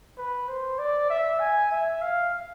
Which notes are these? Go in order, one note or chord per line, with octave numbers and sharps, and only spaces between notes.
B4
C5
D5
E5
G#5
E5
F5